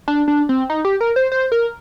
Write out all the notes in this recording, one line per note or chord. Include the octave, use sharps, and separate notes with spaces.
D4
D4
C4
D#4
G4
A#4
C5
C5
A#4